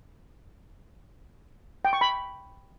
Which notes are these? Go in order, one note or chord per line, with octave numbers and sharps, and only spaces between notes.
G5
C#6
B5